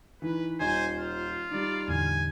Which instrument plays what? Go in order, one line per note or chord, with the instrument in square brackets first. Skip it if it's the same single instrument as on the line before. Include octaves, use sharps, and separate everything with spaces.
[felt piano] D#3 E3 [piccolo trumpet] B4
[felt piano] D#1 D#4 [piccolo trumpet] C5 [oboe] G#5
[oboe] F4 [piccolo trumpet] C5
[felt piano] D#3 G3 [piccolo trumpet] D5
[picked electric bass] E2 A2 D3 [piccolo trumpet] G#5